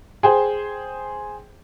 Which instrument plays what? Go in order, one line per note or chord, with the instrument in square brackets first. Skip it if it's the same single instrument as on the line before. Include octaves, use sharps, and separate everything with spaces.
[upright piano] G#4 C5 G5